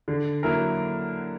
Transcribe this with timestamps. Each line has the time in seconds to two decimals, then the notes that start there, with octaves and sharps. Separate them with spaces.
0.08 D3
0.43 F#3 A#3 E4 A#4